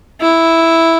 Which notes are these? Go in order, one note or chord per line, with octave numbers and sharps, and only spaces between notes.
E4